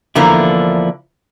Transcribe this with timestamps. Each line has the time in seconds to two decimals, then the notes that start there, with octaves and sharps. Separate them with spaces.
0.15 E2 D3 F3 A#3 E4